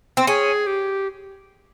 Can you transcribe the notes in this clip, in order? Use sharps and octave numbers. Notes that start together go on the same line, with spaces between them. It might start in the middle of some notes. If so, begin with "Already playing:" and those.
C4
C#4 G#4
G4